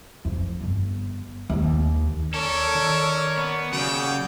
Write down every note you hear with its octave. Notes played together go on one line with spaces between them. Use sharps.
F2
G1
D#2
C#4 A4 A#4 C#5 D5
D#3
B3
D#2 C#3 F#3 D5 F#5 G5